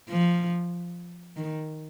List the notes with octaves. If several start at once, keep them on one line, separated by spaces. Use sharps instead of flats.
F3
D#3